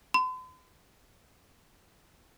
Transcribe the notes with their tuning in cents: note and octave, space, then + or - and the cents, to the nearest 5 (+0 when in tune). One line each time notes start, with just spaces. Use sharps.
C6 -45